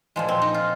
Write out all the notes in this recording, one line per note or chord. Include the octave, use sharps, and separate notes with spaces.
A#2 F3 G#3
C4
D#4
F4